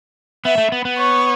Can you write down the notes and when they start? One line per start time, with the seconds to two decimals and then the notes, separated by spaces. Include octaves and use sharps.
0.45 B3 E5
0.58 A3
0.72 B3
0.85 B3
0.98 C#5